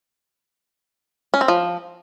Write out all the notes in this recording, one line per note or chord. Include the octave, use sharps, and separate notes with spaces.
C#4
C4
F3